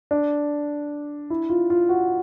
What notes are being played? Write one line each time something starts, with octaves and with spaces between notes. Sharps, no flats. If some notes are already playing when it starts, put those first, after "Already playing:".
D4
E4
F4
F4
F#4